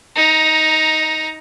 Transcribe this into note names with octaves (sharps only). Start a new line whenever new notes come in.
D#4 A#5